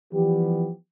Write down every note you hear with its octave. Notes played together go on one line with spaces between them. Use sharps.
E3 F3 G3 B3 G4